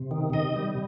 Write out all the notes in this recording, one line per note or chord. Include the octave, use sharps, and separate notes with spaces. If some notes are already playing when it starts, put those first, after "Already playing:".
Already playing: C3
D#3
C3 D#5
G3